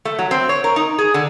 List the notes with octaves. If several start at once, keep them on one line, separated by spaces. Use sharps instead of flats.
A3
F#3
C4
C#5
A#4
D#4
G#4
D3